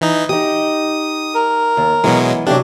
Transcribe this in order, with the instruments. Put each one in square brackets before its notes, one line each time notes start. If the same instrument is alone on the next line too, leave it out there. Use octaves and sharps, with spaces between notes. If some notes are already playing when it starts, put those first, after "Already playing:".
[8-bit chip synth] E3 D#4
[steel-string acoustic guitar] D#4 G4 [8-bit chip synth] D#6
[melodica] A#4
[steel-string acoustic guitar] D#2
[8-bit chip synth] B2 F#3 G#3 [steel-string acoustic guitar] E3 B3
[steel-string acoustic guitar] C3 E3 F#3 [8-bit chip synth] D4 [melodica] G4